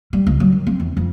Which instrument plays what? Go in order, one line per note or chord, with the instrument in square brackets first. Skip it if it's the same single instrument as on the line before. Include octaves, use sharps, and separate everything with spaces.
[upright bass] G3
C#2
F#3
D#3
C4
E2
F2